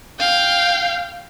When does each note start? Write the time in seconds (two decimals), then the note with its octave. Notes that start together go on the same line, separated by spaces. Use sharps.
0.19 F5 G5